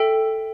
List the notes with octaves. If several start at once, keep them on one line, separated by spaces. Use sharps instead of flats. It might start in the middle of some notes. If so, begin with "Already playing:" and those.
Already playing: A4 E5 G5